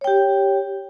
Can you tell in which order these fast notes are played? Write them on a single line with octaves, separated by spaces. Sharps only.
C#5 G5 G4